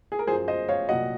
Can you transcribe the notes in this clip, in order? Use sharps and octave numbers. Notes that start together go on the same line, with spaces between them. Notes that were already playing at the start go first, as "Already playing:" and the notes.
G#4
A#4
F#2 F3 G#4 C5
C5 D#5
C#5 F5
C2 A#2 F#3 D#5 F#5